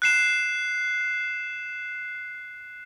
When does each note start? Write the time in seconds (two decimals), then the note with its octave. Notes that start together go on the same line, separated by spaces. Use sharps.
0.02 F#6 C7 E7